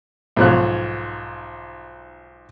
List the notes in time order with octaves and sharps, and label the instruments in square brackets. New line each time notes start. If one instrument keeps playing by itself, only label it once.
[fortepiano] B1 G#2 F3 C#5 F#6